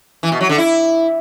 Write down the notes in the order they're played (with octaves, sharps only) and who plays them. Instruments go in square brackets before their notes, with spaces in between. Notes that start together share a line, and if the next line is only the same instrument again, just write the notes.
[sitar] E3
B2
F#3
D3
E4